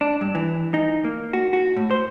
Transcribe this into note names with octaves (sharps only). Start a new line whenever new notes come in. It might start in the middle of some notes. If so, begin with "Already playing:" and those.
D4
G2
E3
D#4
A#3
F#4
F#4
A2
C5